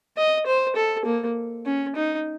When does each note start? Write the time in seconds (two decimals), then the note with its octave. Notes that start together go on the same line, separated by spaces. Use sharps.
0.17 D#5
0.46 C5
0.76 A4
1.05 A#3
1.66 C#4
1.96 D#4